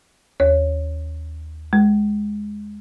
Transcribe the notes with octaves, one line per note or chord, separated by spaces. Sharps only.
D#2 C#5
G#3